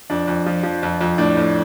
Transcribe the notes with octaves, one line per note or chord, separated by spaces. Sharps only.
F2 D4
F2
F3
F3
F2
F2
A2 D4
A2